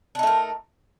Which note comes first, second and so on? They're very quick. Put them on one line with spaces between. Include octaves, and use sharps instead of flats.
D4 D#4 A3 A#4